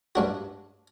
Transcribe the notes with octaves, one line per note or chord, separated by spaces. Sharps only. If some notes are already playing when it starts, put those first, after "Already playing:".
G2 D4 F#4